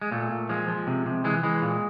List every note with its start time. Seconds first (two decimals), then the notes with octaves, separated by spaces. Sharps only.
0.01 G#3
0.12 A#2 A3
0.31 A#2
0.49 F3 G#3
0.68 F3
0.87 C3
1.06 C3
1.24 E3 G#3
1.43 E3 G#3
1.62 A#2